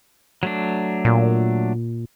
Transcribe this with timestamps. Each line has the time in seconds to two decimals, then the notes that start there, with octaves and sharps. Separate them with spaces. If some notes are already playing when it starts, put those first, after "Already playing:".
0.43 F#3 A3 D4
1.05 A#2